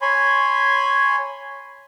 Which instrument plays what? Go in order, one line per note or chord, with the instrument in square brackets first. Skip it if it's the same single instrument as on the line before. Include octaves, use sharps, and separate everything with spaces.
[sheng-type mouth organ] C#5 G#5 B5 C6